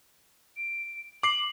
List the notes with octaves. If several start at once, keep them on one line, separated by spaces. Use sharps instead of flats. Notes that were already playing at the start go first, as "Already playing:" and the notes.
D7
D6 C7 F#7